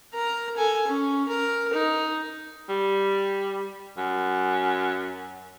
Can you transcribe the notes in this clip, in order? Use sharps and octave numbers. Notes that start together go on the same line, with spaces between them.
A#4 A#5
A4 G#5
C#4
A#4
D#4
G3
F#2